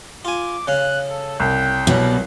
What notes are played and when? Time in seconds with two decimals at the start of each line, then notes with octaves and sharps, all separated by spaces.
0.25 F4 G#5 D6
0.68 C#3 F5 F#6
1.10 A4
1.40 C2 G5
1.87 B2 E3 F#3 G3